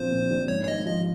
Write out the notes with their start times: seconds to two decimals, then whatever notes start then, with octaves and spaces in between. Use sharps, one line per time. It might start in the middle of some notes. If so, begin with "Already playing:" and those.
Already playing: A#1 A#2 F3 C4 C5
0.11 A#2
0.31 A#1
0.48 G#2 C#5
0.64 C#5
0.68 G#1 D#5
0.86 F3 D#5